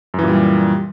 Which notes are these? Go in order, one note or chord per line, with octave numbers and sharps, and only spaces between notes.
F#2 A#2 E3 G3